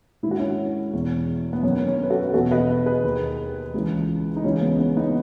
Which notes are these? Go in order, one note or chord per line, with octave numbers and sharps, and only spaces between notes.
G#2 D#3 E4 F#4
C#4 E4
E2 B2
B3
F#2 D#3 C#4
C#4
B4
F#4 A4
E2 B2 F#4 A4
B4 D#5
G#4 B4
D#2 D#3
C#2 C#3 E3
D#4
C#2 C#3 E3 C#4
B3
C#4
B3 D#4